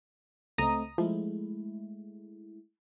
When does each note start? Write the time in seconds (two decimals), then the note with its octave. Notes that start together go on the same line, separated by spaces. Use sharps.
0.58 C#2 A3 C4 D#5 A#5 D#6
0.98 F3 G#3 A3 E4